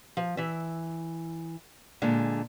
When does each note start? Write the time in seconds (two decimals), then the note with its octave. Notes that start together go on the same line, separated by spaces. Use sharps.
0.17 F3
0.37 E3 E5
2.02 A#2 D3 G#3